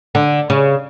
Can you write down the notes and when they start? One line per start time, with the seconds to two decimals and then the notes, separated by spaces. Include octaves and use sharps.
0.15 D3
0.50 C#3